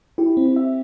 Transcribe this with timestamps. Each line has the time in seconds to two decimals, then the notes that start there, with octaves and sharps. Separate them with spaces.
0.18 E4 G4
0.37 C4
0.56 E5